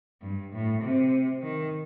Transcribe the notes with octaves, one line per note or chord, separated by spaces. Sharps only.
G2
A2
C3
D#3